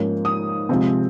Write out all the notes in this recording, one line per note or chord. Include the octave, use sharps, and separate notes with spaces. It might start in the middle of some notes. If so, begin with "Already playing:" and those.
Already playing: G#2 F3 A#3 C#4
D#6
C3 F3 G#3 C4